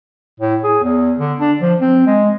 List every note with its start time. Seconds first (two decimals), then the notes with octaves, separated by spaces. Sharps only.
0.40 A2
0.64 G#4
0.83 E2
1.19 D3
1.39 D4
1.61 F3
1.80 C4
2.07 G#3